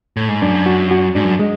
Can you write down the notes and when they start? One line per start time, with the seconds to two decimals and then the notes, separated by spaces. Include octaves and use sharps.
0.17 A2
0.29 G#2
0.42 F#2 D4
0.66 F#4
0.91 F#4
1.15 G#2 D4
1.24 F#2
1.39 G#3